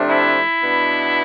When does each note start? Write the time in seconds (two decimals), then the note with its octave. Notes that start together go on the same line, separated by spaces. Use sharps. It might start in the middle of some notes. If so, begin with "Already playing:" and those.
Already playing: C3 F3 A3 D4
0.10 E4
0.62 B2 B3 D4